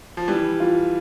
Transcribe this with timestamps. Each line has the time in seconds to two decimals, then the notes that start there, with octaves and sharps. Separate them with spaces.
0.17 F3
0.28 E3 G3
0.60 F4